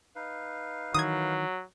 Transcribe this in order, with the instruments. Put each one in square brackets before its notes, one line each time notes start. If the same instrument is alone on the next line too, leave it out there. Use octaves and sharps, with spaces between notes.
[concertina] D#4 B4 F5
[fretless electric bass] D#3 E3 [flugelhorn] F#3 [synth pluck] D#6 G#6